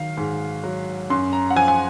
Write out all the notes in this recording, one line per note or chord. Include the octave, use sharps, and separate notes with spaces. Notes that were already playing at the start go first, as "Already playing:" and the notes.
Already playing: D#3 F#3 F5
G#2
F#3
F#2 C6
A#5
F#5
F3 G#5
G#5